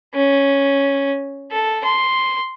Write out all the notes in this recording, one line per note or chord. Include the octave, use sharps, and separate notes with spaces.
C#4
A4
C6